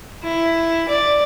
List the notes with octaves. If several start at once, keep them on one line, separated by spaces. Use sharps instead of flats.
E4
D5